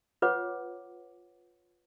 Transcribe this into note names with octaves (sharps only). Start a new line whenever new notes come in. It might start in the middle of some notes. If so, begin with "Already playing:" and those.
F4 B4 C#5 F#5 D6